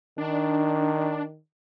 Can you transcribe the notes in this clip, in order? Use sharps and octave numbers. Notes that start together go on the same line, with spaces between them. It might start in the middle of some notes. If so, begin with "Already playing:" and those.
D#3 D4